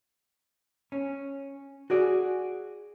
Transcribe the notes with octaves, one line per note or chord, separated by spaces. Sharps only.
C#4
F#4 G#4 D5